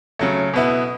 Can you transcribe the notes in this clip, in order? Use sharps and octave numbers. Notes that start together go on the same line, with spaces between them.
C#3 F#3 A3
B2 B3 E4